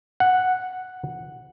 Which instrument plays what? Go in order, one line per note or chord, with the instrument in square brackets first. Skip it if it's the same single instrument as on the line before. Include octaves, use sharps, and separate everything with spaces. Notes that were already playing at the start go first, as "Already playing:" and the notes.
[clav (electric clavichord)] F#5